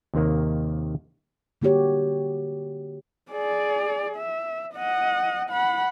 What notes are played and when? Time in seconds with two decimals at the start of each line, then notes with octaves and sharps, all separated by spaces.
0.14 D#2 C3 D#3 A#3
1.62 D3 A#3 F#4 G4 C#5
3.32 G#4 D5
4.17 E5
4.74 D#5 F#5
5.50 F#5 B5